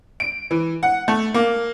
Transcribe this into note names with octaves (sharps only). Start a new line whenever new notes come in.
D7
E3
F#5
A3
A#3